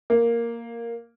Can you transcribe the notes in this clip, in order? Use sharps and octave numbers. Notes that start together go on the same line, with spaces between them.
A#3